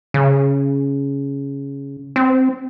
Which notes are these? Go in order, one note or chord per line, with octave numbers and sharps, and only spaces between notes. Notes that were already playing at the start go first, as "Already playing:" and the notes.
C#3
C4